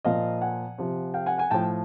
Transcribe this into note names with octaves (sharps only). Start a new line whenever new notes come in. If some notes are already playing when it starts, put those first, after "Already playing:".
A#2 F3 D#5 F5
F#5 G#5
C3 F3
F5 G5
F#5 G#5
F#5 G#5
A2 F3 G5 A5